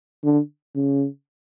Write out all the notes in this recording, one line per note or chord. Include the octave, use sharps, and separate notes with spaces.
D3
C#3